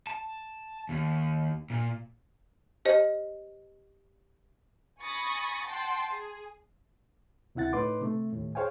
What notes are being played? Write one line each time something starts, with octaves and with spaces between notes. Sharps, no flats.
A5
D#2
A#2
G4 C5 D#5
G#5 B5 C#6 D#6 A6 A#6
F#5 G5 A5 C6
G#4
D2 C3 E4 F#5 A6
A2 D#4 B4 C6 D6
C3 A3
D#2 A2
G#4 C5 C#5 F5 G5 G#5